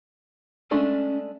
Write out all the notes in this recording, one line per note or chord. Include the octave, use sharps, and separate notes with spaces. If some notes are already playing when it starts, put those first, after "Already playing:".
G#3 A3 C#4 D4